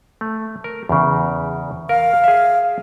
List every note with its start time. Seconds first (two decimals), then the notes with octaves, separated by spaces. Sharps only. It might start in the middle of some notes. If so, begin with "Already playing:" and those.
0.21 A3
0.64 A#4
0.89 E2 C#3
1.89 A#4 F5
2.24 G#4 E5